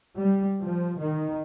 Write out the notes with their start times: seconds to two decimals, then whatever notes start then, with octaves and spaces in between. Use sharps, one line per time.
0.18 G3
0.63 F3
0.99 D#3